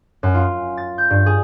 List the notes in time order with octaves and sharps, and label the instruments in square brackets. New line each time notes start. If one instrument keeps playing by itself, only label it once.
[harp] F#2
F4
A6
G6
G2
G#4